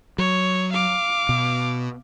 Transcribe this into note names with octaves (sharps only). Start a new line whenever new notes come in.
F#3 C#5
F5 D6
B2